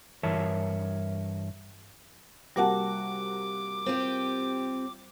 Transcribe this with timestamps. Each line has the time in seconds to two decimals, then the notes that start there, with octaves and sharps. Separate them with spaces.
0.23 G2 E3 A#4 C#5 E5 A5
2.56 C3 G3 A#3 F#4 F#5 A5 D6
3.86 C4 F4 G4